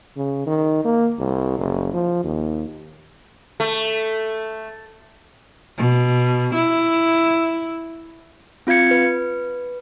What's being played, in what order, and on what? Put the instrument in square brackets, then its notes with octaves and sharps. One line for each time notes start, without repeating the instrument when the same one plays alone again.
[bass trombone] C#3
D#3
A#3
C2
F#1
F3
D#2
[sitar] A3
[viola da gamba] B2
E4
[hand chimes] C4 F4 F5 G#6 C#7
B4